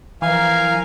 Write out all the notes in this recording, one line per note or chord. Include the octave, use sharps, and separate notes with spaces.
E3 F3 A#4 F5 G#5